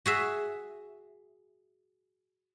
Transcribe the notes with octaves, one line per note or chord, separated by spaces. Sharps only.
F#4 G#4 E5